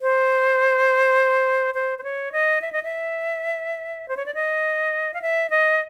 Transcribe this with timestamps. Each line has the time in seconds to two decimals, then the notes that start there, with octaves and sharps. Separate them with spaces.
0.02 C5
1.75 C5
1.98 C5
2.04 C#5
2.32 D#5
2.61 E5
2.73 D#5
2.83 E5
4.08 C5
4.17 C#5
4.26 D5
4.35 D#5
5.14 F5
5.22 E5
5.50 D#5